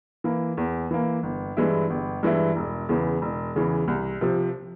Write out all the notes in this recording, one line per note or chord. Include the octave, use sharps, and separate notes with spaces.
E3 A#3
E2
E3 A#3
G1
G2 E3 G#3 E4
G1
G2 E3 G#3 E4
E1
E2 C#3 E3
E1
E2 C#3 E3
C2
C3 F3